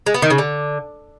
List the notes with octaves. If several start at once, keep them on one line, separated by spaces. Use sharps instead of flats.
G#3
B3
D#3
C#3
D3